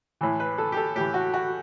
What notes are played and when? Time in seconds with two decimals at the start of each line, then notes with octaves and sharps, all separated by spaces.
0.21 A2 E3
0.40 B4
0.58 A4
0.72 G4
0.77 A4
0.95 A2 E3 G4
1.14 F#4
1.34 F#4